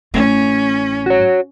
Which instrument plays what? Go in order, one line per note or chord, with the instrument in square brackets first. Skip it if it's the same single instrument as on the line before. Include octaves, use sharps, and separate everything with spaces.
[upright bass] A1 A2 [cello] C#4
[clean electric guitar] F#4 C#5